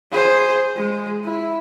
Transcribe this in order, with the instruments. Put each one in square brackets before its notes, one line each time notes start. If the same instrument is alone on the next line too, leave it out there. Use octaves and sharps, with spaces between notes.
[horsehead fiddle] G#4 C5
G#3
E4